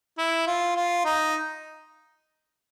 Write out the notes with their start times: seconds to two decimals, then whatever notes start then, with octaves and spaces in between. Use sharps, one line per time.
0.18 E4
0.47 F4
0.76 F4
1.05 D#4